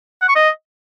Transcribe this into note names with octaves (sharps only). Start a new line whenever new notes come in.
F#5
C#6
D#5